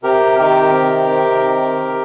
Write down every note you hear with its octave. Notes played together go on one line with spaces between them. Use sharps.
C3 G4 A#4
D#3 G4 A#4
C3
C3
D#3